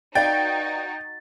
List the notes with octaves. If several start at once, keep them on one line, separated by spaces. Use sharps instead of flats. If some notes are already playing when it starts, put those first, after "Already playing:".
D#4 F#4 B4 D5 F5 G5 A6